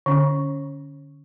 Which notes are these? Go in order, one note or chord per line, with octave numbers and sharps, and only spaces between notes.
D3 C#4